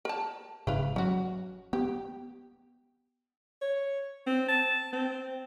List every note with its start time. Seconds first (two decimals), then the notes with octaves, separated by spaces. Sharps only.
0.05 A#4 A5
0.67 F#1 G#2 C#3 E4 B4 F5
0.96 F#3 C#4 F#4
1.73 B3 G4
3.62 C#5
4.27 C4
4.49 A5
4.93 C4